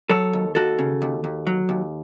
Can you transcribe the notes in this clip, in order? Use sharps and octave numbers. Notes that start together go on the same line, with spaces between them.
F#3 A4 C#5
D#2
D#2 F#4 A4
C#3
D#2
D#2
F#3
D#2